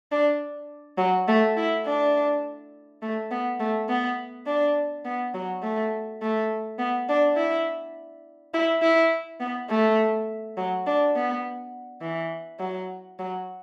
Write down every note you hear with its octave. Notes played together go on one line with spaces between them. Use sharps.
D4
F#3
A3
E4
D4
A3
B3
A3
B3
D4
B3
F#3
A3
A3
B3
D4
E4
E4
E4
B3
A3
F#3
D4
B3
E3
F#3
F#3